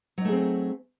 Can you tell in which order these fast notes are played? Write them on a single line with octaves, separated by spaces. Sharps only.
F#3 D#4 A3 G#4 C4